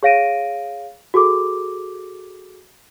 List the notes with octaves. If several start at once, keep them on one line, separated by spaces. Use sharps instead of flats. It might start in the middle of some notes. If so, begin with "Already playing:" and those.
G#4 C#5 F5 A#6 D7 D#7
F#4 G#4 A4 D6